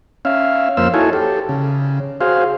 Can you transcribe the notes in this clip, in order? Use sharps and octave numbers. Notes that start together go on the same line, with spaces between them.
C#4 E5 F5
F2 A#3 C5 F5 E6
D#4 E4 F#4 A4 C#5 G#5
G4 A4
C#3
F#4 G#4 C5 F5